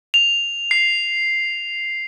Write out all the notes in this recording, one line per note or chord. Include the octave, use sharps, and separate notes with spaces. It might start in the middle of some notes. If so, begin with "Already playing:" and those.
F7
C7